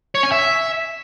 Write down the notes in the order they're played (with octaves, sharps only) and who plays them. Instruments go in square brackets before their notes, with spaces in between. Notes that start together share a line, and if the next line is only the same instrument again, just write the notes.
[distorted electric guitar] C#5
G#5
E5